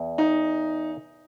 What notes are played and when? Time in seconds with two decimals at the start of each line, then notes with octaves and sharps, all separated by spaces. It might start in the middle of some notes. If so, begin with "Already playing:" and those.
Already playing: E2
0.18 D#4